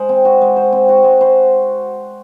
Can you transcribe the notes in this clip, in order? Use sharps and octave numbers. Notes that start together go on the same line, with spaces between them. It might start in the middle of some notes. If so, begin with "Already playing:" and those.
Already playing: G#3 C5
C4
F#4
G#3
C5
C4
F#4
G#3
C5